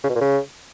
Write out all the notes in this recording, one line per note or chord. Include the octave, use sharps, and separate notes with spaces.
C#3
B2
A#2
C#3